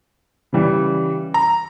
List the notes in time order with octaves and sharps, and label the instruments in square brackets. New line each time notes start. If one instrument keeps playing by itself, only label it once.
[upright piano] C#3 E3 G3
[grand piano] A#5